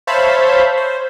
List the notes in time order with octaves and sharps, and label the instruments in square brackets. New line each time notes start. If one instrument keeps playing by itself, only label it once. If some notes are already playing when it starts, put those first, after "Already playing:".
[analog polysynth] C5 C#5 E5 F5 A5 B5
C5